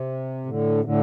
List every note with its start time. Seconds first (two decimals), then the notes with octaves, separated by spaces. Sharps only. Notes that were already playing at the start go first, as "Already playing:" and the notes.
Already playing: C3
0.46 A2 D3
0.80 C3
0.84 A2 D3